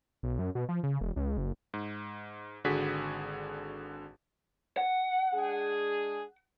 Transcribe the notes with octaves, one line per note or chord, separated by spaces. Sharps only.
B1
F#2
B2
F3
C#3
E1
C#2
F#1
G#2
G#1 D3 F#4 G#4 B6
F#5
G#3 D4 G#4